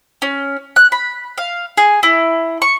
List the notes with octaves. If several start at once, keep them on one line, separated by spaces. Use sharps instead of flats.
C#4
F#6
B5
F5
G#4
E4
C#6